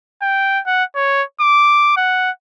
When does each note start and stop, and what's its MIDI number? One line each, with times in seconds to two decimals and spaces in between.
0.22 0.60 79
0.67 0.84 78
0.96 1.23 73
1.41 1.92 86
1.97 2.31 78